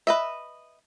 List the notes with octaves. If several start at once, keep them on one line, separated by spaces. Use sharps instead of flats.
B4 D#5 E5